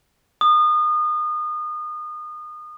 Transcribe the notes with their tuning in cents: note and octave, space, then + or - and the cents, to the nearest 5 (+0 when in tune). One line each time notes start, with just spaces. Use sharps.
D#6 -30